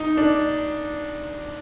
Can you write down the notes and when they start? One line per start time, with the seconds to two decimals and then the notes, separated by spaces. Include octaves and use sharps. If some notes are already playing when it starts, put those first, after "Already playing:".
Already playing: D#4
0.17 D4